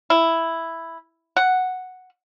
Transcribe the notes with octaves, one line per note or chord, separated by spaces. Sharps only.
E4
F#5